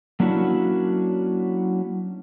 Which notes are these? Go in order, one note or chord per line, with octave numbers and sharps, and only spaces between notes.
F#3 A#3 C#4 D4 E4 F#4